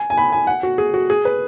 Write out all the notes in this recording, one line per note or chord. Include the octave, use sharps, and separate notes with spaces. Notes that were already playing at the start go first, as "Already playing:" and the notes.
Already playing: G#5
G#5
B5
G#5
F#5
F#4
G#4
F#4
G#4
B4